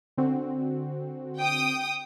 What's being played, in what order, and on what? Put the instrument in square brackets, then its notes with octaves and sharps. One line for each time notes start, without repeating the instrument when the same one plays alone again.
[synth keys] D3 C4 F#4
[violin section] G5 D#6